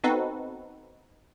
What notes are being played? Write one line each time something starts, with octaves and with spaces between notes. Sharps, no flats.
B3 C4 D#4 F#4 A4 B4